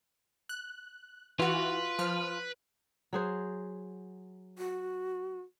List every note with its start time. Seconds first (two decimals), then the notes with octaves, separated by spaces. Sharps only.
0.49 F#6
1.39 E3 F4 F#4 B4
1.99 F3 F6
3.13 F#3 G#4 C5
4.58 F#4